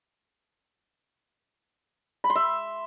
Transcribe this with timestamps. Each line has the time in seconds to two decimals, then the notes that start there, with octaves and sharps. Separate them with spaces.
2.24 B5
2.30 C6
2.35 E5